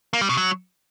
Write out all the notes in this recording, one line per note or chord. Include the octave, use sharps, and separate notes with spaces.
A#3
G3
B2
F#3